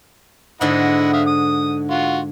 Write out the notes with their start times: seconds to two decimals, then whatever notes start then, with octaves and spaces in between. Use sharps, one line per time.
0.61 G#2 D3 E4 D#5 F#5
1.13 E5 F5 D#6
1.27 D#6
1.90 F4 F#4